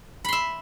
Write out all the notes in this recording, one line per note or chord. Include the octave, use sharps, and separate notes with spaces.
E5 B5 C6